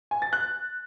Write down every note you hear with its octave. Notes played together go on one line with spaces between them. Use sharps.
G#5
A6
F#6